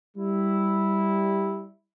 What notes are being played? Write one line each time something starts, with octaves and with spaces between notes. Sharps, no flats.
G3 E4